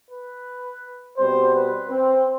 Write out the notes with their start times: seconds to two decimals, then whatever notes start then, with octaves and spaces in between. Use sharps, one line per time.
0.09 B4
1.18 B2 G3 C4 C5
1.56 B4
1.91 C4